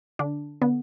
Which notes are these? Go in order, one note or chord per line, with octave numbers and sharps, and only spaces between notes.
D3 D4
D3 B3